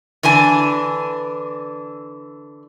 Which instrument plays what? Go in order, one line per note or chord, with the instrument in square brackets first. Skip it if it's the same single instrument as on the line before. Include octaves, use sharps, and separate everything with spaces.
[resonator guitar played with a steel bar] D3 E3 D4 G#5